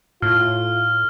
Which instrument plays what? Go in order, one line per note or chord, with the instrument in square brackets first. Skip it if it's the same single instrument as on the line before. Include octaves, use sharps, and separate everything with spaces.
[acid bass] A2 [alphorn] F4 [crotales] F6